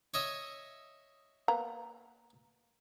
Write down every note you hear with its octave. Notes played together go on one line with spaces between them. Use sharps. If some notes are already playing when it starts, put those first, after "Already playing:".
C#5 D#5 E5
A#3 B3 A#5